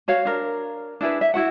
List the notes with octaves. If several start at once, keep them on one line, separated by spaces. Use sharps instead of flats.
F#4 C#5 F5
D4 A#4
D4 E4 G#4 B4
E5
E4 F#4 F#5